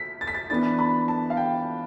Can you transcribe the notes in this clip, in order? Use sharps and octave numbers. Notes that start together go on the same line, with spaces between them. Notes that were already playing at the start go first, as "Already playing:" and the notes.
Already playing: B6
A6
B6
A6
E3 B3 D4 A6
B5
A5
F5
G5